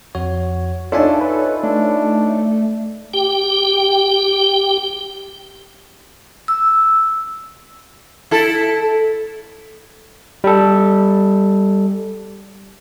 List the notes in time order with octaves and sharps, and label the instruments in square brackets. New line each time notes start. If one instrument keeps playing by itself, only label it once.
[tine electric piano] F2 F#4 C#5
[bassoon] D4 [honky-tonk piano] D#4 C#5 [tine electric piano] F4 E5 G#5 [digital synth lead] A4
[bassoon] B4
[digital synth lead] A3 [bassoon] D4
[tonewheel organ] G4 G5
[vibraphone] E6
[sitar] E4 A4
[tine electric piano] G3 A4